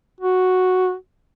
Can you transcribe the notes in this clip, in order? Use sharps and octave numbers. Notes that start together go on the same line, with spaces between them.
F#4